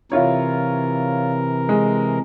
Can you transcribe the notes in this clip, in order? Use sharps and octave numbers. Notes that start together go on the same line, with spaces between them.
C3 E3 E4 F4 A#4 C#5
G#3